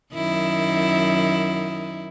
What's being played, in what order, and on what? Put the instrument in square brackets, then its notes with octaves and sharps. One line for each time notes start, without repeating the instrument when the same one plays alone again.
[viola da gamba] F#2 D#3 E4